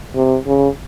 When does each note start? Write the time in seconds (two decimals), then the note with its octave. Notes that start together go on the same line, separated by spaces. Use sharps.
0.15 C3
0.46 C#3